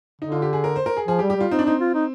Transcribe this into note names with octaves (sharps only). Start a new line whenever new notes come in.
D3 D#4
F4
G4
G#4
A#4
C5
A#4
G#4
F3 G#4
G4
G3
G4
G3 F4
C4 D#4
D4
C4 D#4
F4
D#4